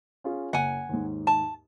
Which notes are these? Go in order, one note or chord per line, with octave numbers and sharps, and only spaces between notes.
C#4 F4 G#4
F#1 F#5 G#5
D#2 G#2
A5